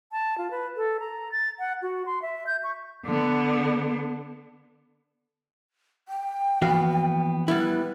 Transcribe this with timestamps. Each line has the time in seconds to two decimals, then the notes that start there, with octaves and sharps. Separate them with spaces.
0.12 A5
0.38 F4
0.51 B4
0.77 A4
1.00 A#5
1.32 A6
1.59 F#5
1.82 F#4
2.06 C6
2.22 E5
2.47 G6
2.64 C#6
3.06 D3 B3
6.08 G5
6.62 E3 F3 A#3 B3 F#4 F5
7.48 G3 B3 E4 B4